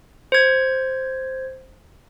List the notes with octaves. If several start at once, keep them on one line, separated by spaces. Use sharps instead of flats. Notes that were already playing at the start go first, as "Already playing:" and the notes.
C5 G#6